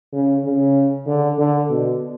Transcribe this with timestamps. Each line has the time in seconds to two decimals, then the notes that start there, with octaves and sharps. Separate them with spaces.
0.13 C#3
0.44 C#3
1.07 D3
1.39 D3
1.69 B2